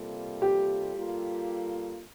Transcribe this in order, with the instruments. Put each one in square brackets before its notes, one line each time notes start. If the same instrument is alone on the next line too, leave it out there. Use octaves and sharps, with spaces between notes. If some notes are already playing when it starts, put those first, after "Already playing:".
Already playing: [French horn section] C3 G3 A#3 F4 A4
[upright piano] G4
[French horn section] G3 A#3 F4 A4